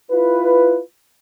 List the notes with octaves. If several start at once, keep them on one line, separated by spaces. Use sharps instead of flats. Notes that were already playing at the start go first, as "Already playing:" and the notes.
E4 F4 B4